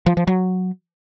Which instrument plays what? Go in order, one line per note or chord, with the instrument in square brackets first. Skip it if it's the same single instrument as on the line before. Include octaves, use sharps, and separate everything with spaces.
[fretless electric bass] F3
F3
F#3